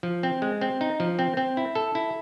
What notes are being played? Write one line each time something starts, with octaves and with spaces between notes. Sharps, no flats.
F3
C4
G#3
C4
D#4
F3
C4
C4
E4
A4
E4